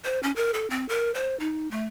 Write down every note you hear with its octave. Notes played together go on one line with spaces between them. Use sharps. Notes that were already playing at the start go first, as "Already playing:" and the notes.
C5
C#4
A#4
A4
C4
A#4
C5
D#4
A3